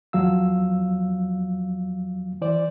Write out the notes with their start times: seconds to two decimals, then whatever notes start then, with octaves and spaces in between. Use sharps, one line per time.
0.13 E2 F3 F#3 F5 E6
2.41 E3 C5 D5